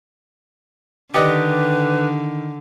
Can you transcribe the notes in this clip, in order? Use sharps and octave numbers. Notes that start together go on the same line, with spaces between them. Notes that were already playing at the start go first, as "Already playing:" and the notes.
D3 D#3 G4 B4 D5 D#5 C#7